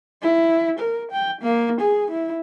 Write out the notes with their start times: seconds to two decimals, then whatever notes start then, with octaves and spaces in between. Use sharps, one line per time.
0.22 E4
0.79 A#4
1.11 G5
1.41 A#3
1.81 G#4
2.11 E4